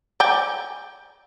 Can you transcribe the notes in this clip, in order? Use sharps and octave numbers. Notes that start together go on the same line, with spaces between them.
D5 G5 G#5